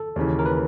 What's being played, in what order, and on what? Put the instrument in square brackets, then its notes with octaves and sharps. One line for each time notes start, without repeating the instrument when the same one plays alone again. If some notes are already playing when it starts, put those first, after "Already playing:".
Already playing: [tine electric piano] A4
[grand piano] D#2 C#3 E3
[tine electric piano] A#4
B4